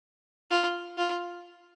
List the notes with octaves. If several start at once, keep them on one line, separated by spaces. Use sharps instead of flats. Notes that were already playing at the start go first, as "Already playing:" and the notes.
F4
F4